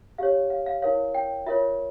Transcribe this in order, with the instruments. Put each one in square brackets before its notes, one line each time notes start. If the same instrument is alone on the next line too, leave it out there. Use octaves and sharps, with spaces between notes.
[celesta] G4 C#5 F5
F5
F5
E4 A#4 C#5 F5
G5
F4 A#4 C#5 E5